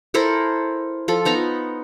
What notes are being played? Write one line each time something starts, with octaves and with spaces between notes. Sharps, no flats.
E4 A4 A#4 C5
F3 F4 A4
B3 D#4 A#5 B5